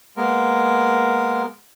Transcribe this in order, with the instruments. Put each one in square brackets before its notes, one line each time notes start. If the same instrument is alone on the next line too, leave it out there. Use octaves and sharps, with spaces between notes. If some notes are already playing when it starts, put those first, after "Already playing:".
[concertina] G#3 A#3 B3 A#4